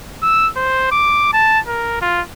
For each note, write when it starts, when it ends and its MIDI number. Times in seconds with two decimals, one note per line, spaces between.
0.23 0.48 88
0.56 0.89 72
0.92 1.30 86
1.33 1.60 81
1.67 2.01 70
2.02 2.22 65